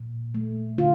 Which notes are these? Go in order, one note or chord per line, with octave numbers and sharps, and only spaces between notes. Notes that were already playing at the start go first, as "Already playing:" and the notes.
Already playing: A#2
A3
D3 F4